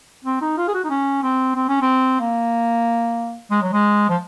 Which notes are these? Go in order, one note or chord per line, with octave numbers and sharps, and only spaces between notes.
C4
D#4
F4
G#4
F#4
D#4
C#4
C4
C4
C#4
C4
A#3
G#3
F#3
G#3
F3